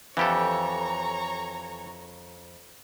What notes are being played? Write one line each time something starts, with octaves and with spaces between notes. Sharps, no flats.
F2 E3 G4 A4 C#5 A#5